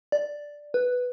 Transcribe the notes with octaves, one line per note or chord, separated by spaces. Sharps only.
D5
B4